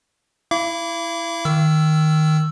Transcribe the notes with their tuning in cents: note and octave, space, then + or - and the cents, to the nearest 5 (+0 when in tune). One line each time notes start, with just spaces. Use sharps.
E4 +0 F5 -45 D6 -20
D#3 +0 E6 +10